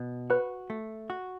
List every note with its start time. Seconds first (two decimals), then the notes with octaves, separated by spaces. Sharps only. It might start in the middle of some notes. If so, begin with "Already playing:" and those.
Already playing: B2
0.30 F#4 B4
0.70 A3
1.10 F#4